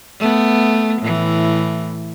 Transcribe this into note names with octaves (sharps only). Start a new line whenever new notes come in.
A3 B3
A2 E3